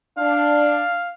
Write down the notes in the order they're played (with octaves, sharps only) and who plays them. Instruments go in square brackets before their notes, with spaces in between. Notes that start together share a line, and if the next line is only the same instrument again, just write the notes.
[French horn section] D4 [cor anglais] F5